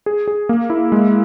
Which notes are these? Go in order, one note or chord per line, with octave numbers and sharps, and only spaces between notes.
G#4
G#4
A#3
E4
G#3